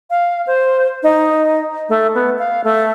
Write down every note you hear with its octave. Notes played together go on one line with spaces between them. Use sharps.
F5
C5
D#4
A3
B3
F5
A3